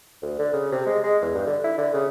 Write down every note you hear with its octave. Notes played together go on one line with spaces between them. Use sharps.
D2
D3
C#3
C3
G#3
G#3
E2
G2
D3
E4
D3
C#3